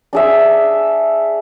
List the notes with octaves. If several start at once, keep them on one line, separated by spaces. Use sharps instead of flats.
D4 G#4 E5